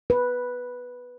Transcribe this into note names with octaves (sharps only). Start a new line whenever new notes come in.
B4